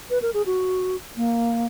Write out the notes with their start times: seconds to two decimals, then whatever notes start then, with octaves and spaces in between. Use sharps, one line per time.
0.10 B4
0.22 A#4
0.34 G#4
0.46 F#4
1.17 A#3